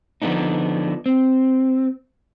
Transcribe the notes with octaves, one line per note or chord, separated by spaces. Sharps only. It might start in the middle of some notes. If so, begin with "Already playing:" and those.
D3 F3 G#3 B3 D4 D#4
C4